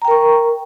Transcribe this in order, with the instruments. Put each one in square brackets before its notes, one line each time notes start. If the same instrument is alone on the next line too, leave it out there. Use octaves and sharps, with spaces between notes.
[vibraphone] A#5
G5
A#4
C#6